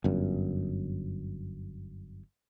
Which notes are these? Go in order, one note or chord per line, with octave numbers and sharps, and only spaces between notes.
G1 F#2